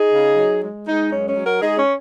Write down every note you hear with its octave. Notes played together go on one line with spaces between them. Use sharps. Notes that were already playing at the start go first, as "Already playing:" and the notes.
Already playing: D#4 G#4
C#3
F#3
G#3
G#3 D#4
F#2 C#4
C#4
F#3
F#4 A#4
G#3 D#4 G#4
C#4